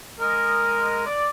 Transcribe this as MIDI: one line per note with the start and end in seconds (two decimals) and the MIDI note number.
0.20 1.04 56
0.20 1.04 70
0.20 1.04 75
1.06 1.28 74